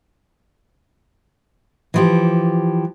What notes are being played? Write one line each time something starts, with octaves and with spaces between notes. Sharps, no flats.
E3 F3 G4